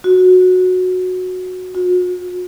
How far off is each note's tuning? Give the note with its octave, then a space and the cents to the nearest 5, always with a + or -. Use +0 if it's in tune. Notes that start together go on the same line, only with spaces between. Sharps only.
F#4 -10
F#4 -45